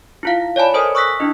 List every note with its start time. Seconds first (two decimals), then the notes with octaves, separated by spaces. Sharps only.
0.23 E4 F4 F5
0.56 C#5 D5 G#5 A5 B5
0.74 A4 A#4 C5 D#5 G#5 D#6
0.95 C#6 D#6 E6 F#6 A#6 B6
1.20 D4 E4 D#5